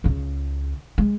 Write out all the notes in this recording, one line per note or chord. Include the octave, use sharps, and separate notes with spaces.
C#2 C#3
G#3